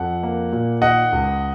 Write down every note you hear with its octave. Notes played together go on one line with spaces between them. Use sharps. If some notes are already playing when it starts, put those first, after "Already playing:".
Already playing: F2 F#5
A#3
A#2
D#3 D#5 F#5
C#2